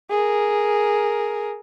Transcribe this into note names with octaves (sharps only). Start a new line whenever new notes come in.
G#4 A#4